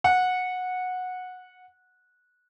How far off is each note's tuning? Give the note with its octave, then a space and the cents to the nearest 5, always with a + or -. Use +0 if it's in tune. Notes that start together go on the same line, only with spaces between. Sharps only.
F#5 -15